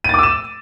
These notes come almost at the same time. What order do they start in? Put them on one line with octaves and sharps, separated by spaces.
D#7 A6 D6 E6 E7